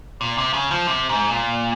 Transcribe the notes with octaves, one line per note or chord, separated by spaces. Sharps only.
A#2
C3
C#3
F3
C3
G#2
A#2